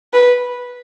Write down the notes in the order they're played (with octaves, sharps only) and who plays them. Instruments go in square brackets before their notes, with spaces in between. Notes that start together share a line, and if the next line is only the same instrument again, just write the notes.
[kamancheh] B4